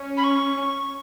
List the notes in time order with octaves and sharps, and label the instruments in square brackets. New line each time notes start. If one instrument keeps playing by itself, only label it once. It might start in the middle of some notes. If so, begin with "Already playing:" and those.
Already playing: [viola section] C#4
[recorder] B5
C#6